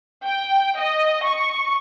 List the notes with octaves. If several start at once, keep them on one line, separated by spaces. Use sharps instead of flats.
G5
D#5
C#6